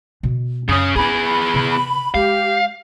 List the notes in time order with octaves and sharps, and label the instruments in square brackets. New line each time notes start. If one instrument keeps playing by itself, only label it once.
[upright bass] B2
[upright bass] F#2 [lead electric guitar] C#3 C#4 [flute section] D#6
[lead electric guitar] B3 G#4 [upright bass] C#4 [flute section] B5
[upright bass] C3
[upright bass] G#3 [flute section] G4 [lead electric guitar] F5